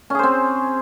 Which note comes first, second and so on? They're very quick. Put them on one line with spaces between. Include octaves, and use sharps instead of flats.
C#4 G#4 C5 C4